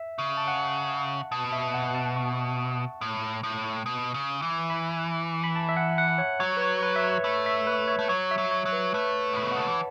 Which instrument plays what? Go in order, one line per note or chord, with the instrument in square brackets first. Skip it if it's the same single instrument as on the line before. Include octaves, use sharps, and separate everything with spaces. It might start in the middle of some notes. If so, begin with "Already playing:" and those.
Already playing: [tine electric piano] E5
[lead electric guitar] C#3
[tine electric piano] A5
F#5
[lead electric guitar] B2 [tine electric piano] A5
[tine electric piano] E5
F#5
A5
C#6
[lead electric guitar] A2
A2
B2
C#3
E3
[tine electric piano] B5
B5
A5
E5
F#5
F#5
C#5
[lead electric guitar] F#3 [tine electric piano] C#5
[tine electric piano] B4
C#5
B4
E5
C#5
[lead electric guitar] A3 [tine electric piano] B5
[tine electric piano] E5
B4
C#5
[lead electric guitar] A3
[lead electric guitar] F#3 [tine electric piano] C#5
[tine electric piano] E5
[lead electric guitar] F#3
[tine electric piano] C#5
[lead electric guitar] F#3
[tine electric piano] B4
[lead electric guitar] A3 [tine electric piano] B4
[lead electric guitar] A2 [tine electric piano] B5
[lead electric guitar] B2
[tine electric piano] F#5
[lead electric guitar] C#3 [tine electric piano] A5
[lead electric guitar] E3